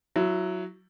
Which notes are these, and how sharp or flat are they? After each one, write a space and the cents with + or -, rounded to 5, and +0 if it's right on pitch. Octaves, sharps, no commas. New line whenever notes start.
F#3 +0 E4 +20